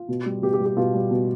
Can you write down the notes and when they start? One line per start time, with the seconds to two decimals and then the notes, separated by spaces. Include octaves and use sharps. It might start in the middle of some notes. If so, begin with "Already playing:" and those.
Already playing: F4
0.08 B2
0.26 G3
0.42 B2 G4
0.54 G4
0.60 G3
0.65 G4
0.77 B2 F4
0.94 G3
1.11 B2